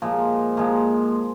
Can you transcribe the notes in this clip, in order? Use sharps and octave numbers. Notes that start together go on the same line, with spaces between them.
A#2 F3 G#3
A#2 F3 G#3